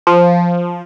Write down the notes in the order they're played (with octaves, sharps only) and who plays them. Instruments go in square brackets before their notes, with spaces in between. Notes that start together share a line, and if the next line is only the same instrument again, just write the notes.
[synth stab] F3